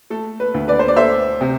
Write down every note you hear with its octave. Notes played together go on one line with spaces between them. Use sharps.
A3 A4
B4
D2
B4 D5
C5
D5
A3 C5 E5
C3